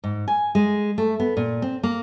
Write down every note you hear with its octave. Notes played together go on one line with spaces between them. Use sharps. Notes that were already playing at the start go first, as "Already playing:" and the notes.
G#2
G#5
G#3
A3
B3
A#2
C4
A#3